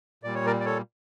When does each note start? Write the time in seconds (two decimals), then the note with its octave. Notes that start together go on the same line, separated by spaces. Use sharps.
0.23 A#2 G3 D5
0.35 C#5
0.46 A#4 D5
0.60 D5
0.65 A4 C#5